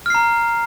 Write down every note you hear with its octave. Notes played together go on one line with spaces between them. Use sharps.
A#5 F6 C7